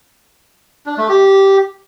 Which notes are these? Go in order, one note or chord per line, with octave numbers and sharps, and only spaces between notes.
D4
A3
G4